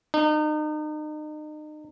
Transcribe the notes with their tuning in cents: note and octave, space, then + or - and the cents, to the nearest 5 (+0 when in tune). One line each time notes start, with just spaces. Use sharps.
D#4 -35